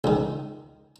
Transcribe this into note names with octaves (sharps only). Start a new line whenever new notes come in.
C#2 D#3